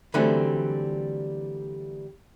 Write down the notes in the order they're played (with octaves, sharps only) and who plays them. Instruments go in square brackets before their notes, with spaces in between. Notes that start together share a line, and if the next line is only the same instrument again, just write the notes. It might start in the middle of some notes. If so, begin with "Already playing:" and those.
[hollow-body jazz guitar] D3 E3 F#3 G3 A3 C4